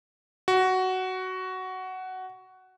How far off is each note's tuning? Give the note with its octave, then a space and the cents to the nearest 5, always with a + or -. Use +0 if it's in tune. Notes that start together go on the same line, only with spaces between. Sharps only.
F#4 +10